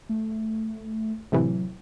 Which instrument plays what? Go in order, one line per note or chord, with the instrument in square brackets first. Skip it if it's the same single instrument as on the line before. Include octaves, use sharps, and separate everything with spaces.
[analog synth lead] A3
[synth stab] A2 C3 E3 [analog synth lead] F#3